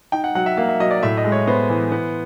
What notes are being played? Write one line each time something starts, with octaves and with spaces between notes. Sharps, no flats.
D#4 G5
F#5
F#3 F#5
E5
A#3 F5
E5
F#3 D#5
D5
A2 E5
D#5
G#3
C#5
B3 C5
E3
B3